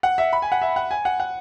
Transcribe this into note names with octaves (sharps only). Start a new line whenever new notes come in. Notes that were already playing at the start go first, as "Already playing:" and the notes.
F#5
E5
B5
G#5
F#5
E5
F#5
G#5
F#5
F#5